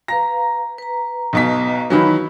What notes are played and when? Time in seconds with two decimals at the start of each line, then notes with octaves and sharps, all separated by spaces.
0.08 B4 F5 A#5 A#6
0.78 B4 A#5
1.33 B1 B2 B6
1.90 D#3 E3 F#3 B4 F5 B5